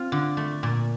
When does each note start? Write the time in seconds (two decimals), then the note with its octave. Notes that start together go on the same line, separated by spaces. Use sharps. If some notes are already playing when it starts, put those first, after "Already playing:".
Already playing: C4 F4
0.12 D3
0.37 A3
0.63 A#2